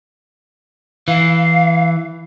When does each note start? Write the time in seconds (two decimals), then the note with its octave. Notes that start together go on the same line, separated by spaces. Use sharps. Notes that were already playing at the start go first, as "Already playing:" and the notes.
1.08 E3 F5